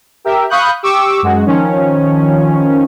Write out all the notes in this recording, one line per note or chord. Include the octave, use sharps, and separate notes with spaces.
G4 A#4 E5
F5 B5 C#6 D#6 F#6 G6
G4 C#6 D6 E6
F#2 G#3 F#4
D#3 F3 C#4